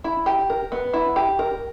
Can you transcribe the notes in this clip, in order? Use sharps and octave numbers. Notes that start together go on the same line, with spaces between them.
E4
G4
A#4
B3
E4
G4
A#4